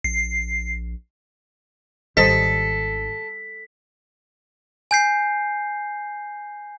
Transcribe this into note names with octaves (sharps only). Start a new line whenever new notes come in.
A#1 C7
G#1 D#3 G3 A4 C5 D#5 B6
G#5 G6 C7